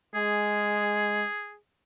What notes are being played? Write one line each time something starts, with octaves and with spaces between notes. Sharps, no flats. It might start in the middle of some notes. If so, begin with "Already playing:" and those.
G#3 G#4